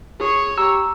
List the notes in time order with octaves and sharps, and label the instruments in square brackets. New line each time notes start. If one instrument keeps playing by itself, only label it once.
[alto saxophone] G#4 [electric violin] C#5 C#6
[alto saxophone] G4 [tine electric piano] A#5 E6